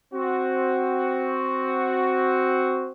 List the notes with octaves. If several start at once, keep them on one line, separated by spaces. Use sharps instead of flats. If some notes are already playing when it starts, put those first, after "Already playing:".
C4 F#4